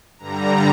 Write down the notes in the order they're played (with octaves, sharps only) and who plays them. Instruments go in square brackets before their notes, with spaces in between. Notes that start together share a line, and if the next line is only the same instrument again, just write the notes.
[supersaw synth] G2 D3 G3 A#5